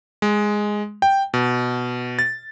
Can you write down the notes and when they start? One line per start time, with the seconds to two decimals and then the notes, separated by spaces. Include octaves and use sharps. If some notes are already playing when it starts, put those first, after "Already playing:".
0.22 G#3
1.02 G5
1.34 B2
2.19 A6